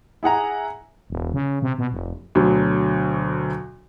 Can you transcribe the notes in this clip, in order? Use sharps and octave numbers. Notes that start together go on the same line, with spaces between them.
E4 G#4 F#5 A#5
E1
C#3
C3
B2
F1
D2 B2 D3 F#3